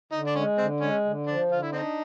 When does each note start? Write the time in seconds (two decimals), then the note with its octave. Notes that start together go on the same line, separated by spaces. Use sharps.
0.12 D3 D#4
0.27 D4
0.35 G#3 C#4
0.58 D3 C4
0.81 G#3 C#4
1.04 D3
1.26 F3 D4
1.50 D3 F4
1.62 E4
1.72 C4 D4 D#4